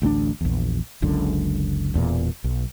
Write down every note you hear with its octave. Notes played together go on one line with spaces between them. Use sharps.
A1 D2 G3 D4
A#1 E2
F#1 C#2 F#2 D3
E1 E2 A#2 A#3
B1